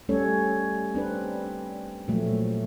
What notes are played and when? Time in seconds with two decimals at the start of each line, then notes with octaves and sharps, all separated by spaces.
0.09 G3 A3 C#4 A4 C#5
0.94 C4 D4 B4
2.08 A#2 F3 F#3 A3